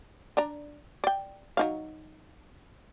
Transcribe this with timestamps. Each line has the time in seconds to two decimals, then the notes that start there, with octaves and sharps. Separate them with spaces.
0.37 D4 D5 A#5
1.04 D5 G5
1.57 F#3 D#4 F5